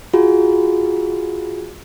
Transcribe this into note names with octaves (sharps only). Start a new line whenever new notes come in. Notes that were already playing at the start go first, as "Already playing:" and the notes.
F4 F#4 G#4